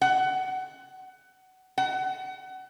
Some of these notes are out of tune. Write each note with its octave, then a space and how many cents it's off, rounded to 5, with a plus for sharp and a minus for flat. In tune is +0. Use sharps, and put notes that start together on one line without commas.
F#5 +20
F#5 +25